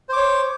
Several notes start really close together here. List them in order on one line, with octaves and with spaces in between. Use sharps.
C5 D6 C#5